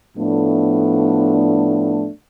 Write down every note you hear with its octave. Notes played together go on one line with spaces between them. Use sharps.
A2 F3 A3 B3 D4